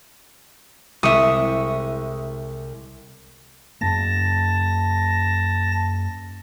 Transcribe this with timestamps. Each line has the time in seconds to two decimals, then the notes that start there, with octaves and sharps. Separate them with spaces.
1.03 C2 G#3 E5 C#6 D#6
3.81 F#2 A#3 A5 A#6